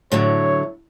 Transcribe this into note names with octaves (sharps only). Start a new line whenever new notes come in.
A2 D3 F#3 C#5